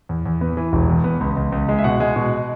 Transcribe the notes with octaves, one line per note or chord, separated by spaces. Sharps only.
E2
E2
B3
E3
E1
E2
B3
C#2
C#2
C#2
G#3
E5
B2 F#5
G#3
B2